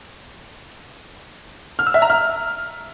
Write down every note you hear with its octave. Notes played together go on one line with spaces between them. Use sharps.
F6
E6
E5
A#5
F6